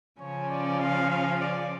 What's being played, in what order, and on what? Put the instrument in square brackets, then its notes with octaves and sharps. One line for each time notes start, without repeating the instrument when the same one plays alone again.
[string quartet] C#3 F3 C#4 [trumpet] C#5
[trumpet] D5
F5
F5
D5